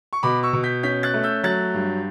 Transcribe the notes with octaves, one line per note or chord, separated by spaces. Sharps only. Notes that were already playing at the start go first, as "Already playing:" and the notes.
C#6
B2 B5 D6
C#6 E6
B2
G6 B6
C#4 G6 B6
F#6 A6
A3
E6 G6
F#3 F#6 A6
G2